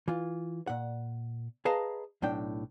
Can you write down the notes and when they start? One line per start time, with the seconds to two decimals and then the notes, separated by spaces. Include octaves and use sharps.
0.08 E3 F4
0.67 A#2 F#5
1.65 G#4 B4 D#5 F5 A5 A#5
2.22 B1 A2 F#3 D4 G5